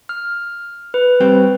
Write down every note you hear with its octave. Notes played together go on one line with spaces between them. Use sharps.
F6
B4
G3 C4 G4